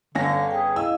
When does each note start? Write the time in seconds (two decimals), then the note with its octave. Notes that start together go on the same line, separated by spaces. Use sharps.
0.15 G1 D3 C#4 F5 A#6
0.51 G#4 B4 G5
0.76 E4 D#5 F5 E6